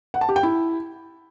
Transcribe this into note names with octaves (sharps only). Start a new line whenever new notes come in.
F#5
A5
G4
G5
E4